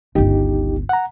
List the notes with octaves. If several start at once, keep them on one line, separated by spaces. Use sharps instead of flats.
G1 C#2 D#4 G4
F#5 A#5